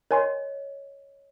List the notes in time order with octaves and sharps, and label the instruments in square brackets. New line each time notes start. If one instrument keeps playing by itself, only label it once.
[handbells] A#4 G#5 C6 [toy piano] C#5 D#5